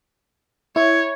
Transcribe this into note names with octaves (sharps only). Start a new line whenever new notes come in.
E4 C#5